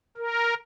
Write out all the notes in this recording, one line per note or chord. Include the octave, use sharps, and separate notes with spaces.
A#4